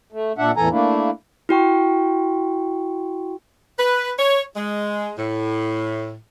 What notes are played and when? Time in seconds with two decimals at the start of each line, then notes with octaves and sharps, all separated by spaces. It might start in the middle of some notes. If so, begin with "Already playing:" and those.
0.12 A3
0.38 A#2 D4 E5 F#5
0.57 E2 A2 E3 A4 G#5 A#5
0.71 A3 A#3 D4 E4
1.49 E4 F#4 G5 C#6
3.79 B4
4.19 C#5
4.56 G#3
5.18 A2